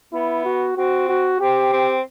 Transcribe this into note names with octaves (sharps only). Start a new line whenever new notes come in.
B3 E4
F#4
C4 F#4
F#4
C4 G4
C4